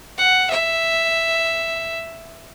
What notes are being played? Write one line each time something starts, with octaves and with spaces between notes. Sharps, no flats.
F#5
E5